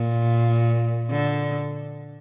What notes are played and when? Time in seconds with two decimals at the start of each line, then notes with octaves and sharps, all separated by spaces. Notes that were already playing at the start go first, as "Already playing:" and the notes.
Already playing: A#2
1.11 D3